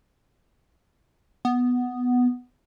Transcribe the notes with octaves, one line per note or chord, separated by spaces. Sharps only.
B3